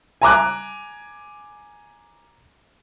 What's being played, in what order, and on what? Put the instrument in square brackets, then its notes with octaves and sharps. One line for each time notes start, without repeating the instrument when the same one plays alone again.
[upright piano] G#5 A#5 D6 F#6